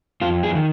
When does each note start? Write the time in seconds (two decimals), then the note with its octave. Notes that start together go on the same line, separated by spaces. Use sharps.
0.21 F2 F4
0.43 G#4
0.55 D#3